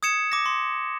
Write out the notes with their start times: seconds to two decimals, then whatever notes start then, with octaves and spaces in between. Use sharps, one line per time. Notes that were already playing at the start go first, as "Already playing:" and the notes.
0.03 D#6 G#6 C#7 E7
0.32 D6 A#6
0.46 C6